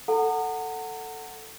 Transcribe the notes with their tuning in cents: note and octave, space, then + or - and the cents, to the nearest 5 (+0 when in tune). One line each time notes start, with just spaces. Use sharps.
A4 +10 F#5 +0 A#5 -40